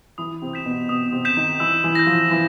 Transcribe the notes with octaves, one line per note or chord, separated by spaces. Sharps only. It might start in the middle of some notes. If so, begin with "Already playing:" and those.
E3 E4 D#6
C3 C4
G6 B6 E7
B2 B3
B2 B3 D#6
C3 C4
G6 B6 E7
D#3 D#4
E3 E4 E6
E3 E4
G6 A#6
F3 F4
E3 E4 E6